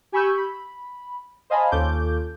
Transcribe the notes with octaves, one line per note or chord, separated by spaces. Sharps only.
G4 G#5 B5 C#6 E6 G6
B5
C5 D#5 F5 G#5 A5 B5
D#2 C#4 F4 A4 D6 G6